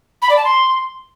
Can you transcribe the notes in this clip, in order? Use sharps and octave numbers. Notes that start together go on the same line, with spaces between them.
B5
D5
A5
C6